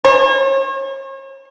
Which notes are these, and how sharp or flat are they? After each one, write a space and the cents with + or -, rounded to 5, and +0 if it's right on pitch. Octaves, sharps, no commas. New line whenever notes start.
C#5 -40